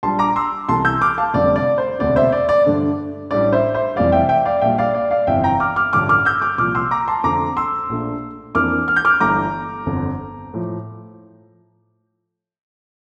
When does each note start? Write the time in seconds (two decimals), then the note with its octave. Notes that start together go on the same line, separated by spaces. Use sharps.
0.03 A#1 A#2 G3 D4 A5 C6
0.19 A#5 D6
0.36 C6 E6
0.68 C2 C3 E3 A3 A5 C6
0.85 E6 G6
1.01 D6 F6
1.18 F5 A5
1.34 F1 F2 D3 G3 C4 D5
1.56 D5
1.78 C5
1.99 E1 D2 C3 D5
2.16 C5 E5
2.32 D5
2.49 D5
2.65 G2 D3 A3 D4
3.30 A1 A2 G3 D4 D5
3.53 C5 E5
3.74 C5 E5
3.96 F1 F2 E3 G3 D5 F5
4.12 E5 G5
4.29 E5 G5
4.45 D5 F5
4.61 A#1 A#2 G3 E5 G5
4.78 D5 F5
4.94 D5
5.11 D5 F5
5.27 G1 F2 C3 E3 E5 G5
5.44 G5 A#5
5.60 D6 F6
5.76 D6 F6
5.93 A1 G2 D3 F3 A3 D6 F6
6.09 D6 F6
6.25 E6 G6
6.42 D6 F6
6.58 C2 A#2 F3 D6 F6
6.75 C6 E6
6.91 A#5 D6
7.08 A5 C6
7.24 F2 D3 A3 C4 A#5 D6
7.57 C6 E6
7.89 A#1 A#2 A3 D4
8.55 F2 E3 A#3 D4 D6 F6
8.88 F6
8.96 G6
9.05 D6 F6
9.21 G1 G2 E3 A3 A#5 D6
9.86 G1 F2 D3
10.54 A2 F3